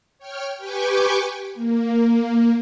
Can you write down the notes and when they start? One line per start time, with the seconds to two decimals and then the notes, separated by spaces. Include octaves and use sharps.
0.19 C#5 G5 F6
0.58 G4 B4 G5 G#5 C#6 D6
1.54 A#3